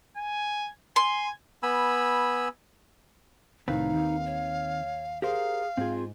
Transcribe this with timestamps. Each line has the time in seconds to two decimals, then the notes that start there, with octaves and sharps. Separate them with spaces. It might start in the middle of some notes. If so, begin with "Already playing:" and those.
0.17 G#5
0.96 G#5 C6
1.63 B3 G#5 B5 E6
3.68 C2 A2 D#3 C4 D#4 B4 F5
3.93 D#2
4.26 C#5
5.22 G4 G#4 A#4 C5 F5
5.77 G#2 C4 F4 G#4